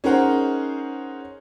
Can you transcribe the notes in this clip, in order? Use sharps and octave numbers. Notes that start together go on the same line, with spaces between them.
C#4 D#4 G#4 A#4 C5 F#5